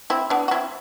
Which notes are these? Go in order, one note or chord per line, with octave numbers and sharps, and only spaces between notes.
C4 E4
B3 D4
F#4
C4 E4